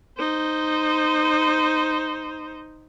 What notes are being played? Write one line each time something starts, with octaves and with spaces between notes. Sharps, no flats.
D#4 C5